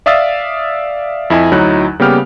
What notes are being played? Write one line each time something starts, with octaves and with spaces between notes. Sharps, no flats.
D5 E5 F5 D#6 E6 A6
F2 E4 D#5 G#5 B5
D2 F#3 D#4 E4 F#6
C#3 G3 A#3 B3 G4 F6